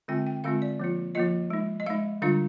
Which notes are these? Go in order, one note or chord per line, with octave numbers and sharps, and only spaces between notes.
D3 G#3 C4 F4 G5
G5
D3 G#3 C4 F4 F5
D5
F3 A#3 F4
F3 A#3 F4 D#5
G#3 D#4
D#5
G#3 D#4 F5
D3 G3 D4 F4 F5